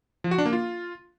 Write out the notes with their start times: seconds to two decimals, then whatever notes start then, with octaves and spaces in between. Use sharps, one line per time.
0.24 F3
0.31 F#4
0.38 D4
0.46 A#3
0.53 F4